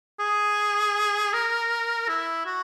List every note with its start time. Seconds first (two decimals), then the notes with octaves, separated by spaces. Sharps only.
0.20 G#4
1.33 A#4
2.08 E4
2.46 F#4